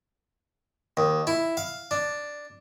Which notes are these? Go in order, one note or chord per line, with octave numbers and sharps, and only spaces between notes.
D#2
E4
F5
D4